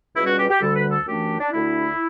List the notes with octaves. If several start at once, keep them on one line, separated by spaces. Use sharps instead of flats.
C#2 B2 G3 C#4 E4
F#4
G4
G4
D2 D3 G3 A4
B4
A4
F#2 E3 A3 D4 G4
D4
D2 D3 A3 D4 E4